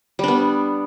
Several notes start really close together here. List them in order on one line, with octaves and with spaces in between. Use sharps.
G3 D4 B3